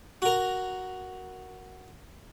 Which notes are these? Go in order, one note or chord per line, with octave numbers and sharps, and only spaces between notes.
F#4 A#4